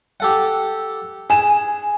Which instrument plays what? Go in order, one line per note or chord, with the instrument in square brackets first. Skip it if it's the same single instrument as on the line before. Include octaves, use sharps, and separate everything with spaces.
[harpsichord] G4 A4 F#5
[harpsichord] G#4 [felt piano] G#5 E7